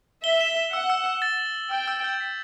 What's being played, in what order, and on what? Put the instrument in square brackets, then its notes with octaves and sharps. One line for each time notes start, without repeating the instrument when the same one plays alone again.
[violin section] E5 [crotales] G7
[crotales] E7
E7
[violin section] F#5 [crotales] E6
[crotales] E6
E6
A6
F#7
F#7
[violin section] G5 [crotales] E6
[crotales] E6
G6
B6